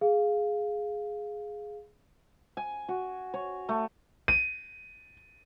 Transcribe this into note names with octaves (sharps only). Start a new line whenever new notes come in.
G#4 F5
G#5
F#4
C#5
A3
D#7